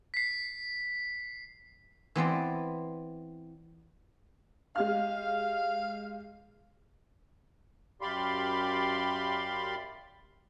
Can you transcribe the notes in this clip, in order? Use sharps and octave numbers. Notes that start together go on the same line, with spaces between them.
B6 C7
E3 B3 C4 D5
G#3 G4 F5 F6
F#2 G4 D5 F5 B5 C6